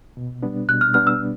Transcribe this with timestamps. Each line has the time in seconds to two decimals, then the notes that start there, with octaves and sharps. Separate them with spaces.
0.17 B2
0.43 G3 B3 D4
0.69 B2 F#6
0.81 F6
0.94 G3 B3 D4 F6
1.07 E6